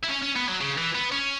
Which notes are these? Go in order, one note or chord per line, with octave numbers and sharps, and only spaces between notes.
E4
C#4
C#4
B3
F#3
C#3
E3
B3
C#4